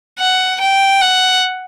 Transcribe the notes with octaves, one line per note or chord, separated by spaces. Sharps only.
F#5
G5
F#5